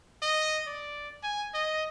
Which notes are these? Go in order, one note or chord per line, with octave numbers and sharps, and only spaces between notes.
D#5
D5
G#5
D#5